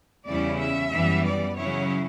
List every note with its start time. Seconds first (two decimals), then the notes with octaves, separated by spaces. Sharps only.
0.26 E2 C#3 G3 C#4 E4 D5
0.59 E5
0.92 F#2 E3 G3 B3
1.25 D5
1.58 C#3 F#3 C#4 E4 C#5